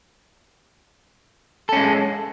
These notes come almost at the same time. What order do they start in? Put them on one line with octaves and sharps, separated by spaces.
A4 C#4 G#3